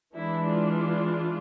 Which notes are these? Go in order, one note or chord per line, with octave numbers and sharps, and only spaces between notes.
E3 G#3 D4 E4
F4